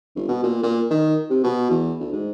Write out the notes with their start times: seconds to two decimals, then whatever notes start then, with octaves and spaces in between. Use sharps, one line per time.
0.16 G1
0.28 B2
0.43 A#2
0.63 A#2
0.90 D#3
1.30 C3
1.43 B2
1.70 E2
2.00 D2
2.13 G#2